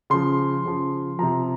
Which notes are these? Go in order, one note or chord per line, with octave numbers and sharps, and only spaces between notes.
C#3 F3 C6
C#3 F3
C3 F3 A#5